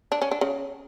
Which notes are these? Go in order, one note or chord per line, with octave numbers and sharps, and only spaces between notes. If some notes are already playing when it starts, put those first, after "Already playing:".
D4
C#4
D4
C#3